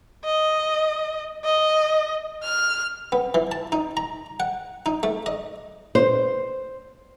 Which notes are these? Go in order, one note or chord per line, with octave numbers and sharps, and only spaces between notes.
D#5
D#5
F6
B3
E3
A5
D#4
A#5
F#5
D#4
A3
D#5
C5